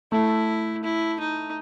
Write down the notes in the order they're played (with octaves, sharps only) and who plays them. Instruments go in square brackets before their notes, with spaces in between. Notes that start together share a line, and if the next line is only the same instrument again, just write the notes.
[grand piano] A3 [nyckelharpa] E4
[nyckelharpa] E4
D#4